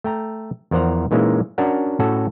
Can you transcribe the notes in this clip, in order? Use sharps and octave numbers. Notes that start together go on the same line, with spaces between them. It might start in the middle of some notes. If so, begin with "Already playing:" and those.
A3 G5 A#5
E2 F3 A#4 C5 F#5 A#5
A#2 E3 G#3 A#3 C#4 D#4
C#4 D4 F#4 A#4 F#5
A2 C#4 F#4 A4